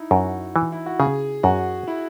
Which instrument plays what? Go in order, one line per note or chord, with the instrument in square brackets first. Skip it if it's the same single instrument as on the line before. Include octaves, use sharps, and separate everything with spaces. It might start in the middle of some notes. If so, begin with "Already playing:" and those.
Already playing: [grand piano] D#4 E4
[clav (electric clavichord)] F#2 [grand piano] F#4
[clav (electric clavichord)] E3
[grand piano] E4
F#4
[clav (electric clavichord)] C#3 [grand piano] G#4
[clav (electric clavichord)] F#2 [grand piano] F#4
[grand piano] E4